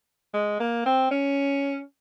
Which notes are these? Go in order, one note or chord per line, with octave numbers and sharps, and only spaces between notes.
G#3
A#3
C4
C#4